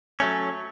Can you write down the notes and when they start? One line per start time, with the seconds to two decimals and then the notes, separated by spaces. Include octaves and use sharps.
0.20 F#3 A3 C#4